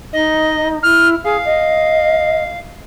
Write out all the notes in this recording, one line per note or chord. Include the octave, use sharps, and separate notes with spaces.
D#4 D#5
E4 F6
G#4 F5
D#5